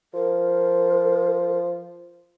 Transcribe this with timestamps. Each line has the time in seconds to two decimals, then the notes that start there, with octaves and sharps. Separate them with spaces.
0.14 F3 A#4